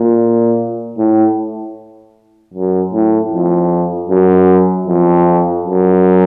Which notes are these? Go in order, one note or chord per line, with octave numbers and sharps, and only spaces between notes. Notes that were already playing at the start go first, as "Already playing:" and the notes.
Already playing: A#2
A2
F#2
A2
F2
F#2
F2
F#2